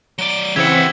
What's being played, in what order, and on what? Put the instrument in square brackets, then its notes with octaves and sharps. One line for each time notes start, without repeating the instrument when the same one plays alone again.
[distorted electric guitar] F#3 D5 [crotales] G7
[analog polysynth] C#3 E3 C4 [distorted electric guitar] G4 F#5 [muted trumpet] E5 [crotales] G#6